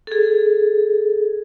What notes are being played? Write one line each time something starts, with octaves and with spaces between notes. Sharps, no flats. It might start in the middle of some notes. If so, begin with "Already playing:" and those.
G#4 A4